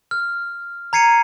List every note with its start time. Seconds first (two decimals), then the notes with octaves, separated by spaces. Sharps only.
0.11 F6
0.93 A#5 G#6 C7 C#7 D#7